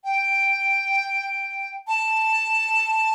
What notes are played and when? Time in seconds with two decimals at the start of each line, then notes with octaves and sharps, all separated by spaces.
0.04 G5
1.88 A5